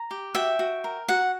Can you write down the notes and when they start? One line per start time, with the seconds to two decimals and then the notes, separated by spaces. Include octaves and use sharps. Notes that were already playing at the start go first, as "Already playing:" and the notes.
Already playing: A#5
0.11 G4
0.35 F#4 E5 G5
0.59 F#4
0.84 A#4
1.09 F#4 F#5